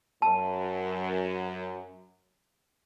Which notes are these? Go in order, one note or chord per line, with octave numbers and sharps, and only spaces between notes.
F#2 A5